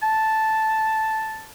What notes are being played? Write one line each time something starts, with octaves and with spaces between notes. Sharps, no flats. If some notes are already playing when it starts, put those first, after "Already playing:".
A5